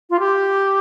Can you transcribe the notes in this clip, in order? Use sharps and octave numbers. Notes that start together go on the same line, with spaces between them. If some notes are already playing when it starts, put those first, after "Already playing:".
F4
G4